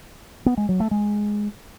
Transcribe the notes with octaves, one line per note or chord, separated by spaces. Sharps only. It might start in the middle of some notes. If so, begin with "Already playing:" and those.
B3
G#3
F#3
A3
G#3